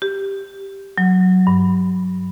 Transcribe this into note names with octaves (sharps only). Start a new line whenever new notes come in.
G4
F#3
G2